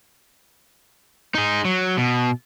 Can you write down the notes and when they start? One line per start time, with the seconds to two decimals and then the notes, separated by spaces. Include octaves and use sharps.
1.35 D#4 G#4
1.65 F#3
1.97 B2